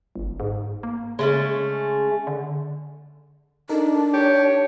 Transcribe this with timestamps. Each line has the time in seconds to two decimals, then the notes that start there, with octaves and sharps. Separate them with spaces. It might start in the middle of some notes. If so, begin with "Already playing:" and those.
0.16 G1
0.40 G#2
0.83 A#3
1.19 C#3 G#3 A3 C#4
2.27 D3
3.69 D4 D#4 A4 A#4
4.13 G4 C#5